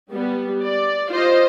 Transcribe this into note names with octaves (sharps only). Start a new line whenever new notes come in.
G3 B3
D5
F4 C5 D#5